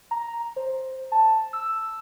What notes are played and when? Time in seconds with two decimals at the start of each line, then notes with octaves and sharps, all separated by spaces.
0.11 A#5
0.56 C5
1.12 A5
1.53 E6